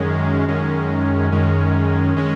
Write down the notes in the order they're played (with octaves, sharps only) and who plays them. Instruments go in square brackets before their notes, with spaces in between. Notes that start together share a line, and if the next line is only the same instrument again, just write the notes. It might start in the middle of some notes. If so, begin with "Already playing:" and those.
Already playing: [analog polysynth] F#2 D#3 G#3 C#4
F#2 D#3 G#3 C#4
F#2 D#3 G#3 C#4
D#3 G#3 C#4